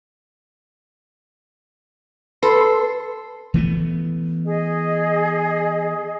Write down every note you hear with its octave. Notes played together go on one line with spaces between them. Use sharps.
A4 B4 C6
E3 A3 B3
G#4 D#5